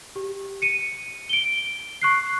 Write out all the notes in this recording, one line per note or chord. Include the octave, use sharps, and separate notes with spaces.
G4
C#7 D#7
D7 G7
C#6 F#6 C7